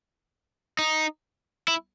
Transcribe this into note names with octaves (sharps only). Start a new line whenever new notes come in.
D#4
E4